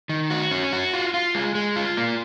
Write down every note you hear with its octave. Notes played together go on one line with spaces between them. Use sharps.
D#3
F#4
C#4
F#4
F4
F4
G#3
G#3
F4
A#3